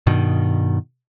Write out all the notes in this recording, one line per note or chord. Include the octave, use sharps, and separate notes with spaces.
G2 B2 D#3